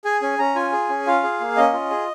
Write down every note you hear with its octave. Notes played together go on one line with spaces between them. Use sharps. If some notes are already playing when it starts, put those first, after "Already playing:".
G#4 G#5
C#4 G#5
C#4 A#5
F4 G#5
G#4
C#4
F4 F5
G#4
A#3
C#4 D#5
F4
G#4